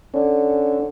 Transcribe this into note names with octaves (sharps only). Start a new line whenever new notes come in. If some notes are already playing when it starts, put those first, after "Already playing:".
D3 C#4